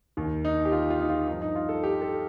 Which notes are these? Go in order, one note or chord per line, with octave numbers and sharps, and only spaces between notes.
D#2 D#3
D#4
G4
F4
F4
D#4
F4
G2 F3 D#4
D#4
F4
A4
G4
A4